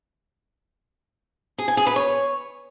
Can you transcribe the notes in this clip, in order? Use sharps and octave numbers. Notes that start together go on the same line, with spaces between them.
G#4
G#5
G#4
B4
C#5